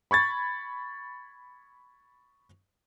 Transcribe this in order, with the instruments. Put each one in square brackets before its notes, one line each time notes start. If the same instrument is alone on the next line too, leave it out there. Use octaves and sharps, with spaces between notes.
[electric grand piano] B5 C#6 G#6 A6